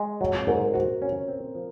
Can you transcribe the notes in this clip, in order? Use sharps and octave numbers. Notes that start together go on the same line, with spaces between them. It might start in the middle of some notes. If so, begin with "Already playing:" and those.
Already playing: G#3
F#3
G#2 A#4
F#4 C5
C#4
C4
F3